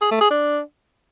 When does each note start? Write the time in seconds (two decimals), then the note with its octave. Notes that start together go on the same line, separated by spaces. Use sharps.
0.01 G#4
0.11 A3
0.21 G#4
0.30 D4